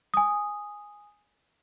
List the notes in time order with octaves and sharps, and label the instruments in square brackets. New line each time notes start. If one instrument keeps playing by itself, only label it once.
[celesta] G#5 D#6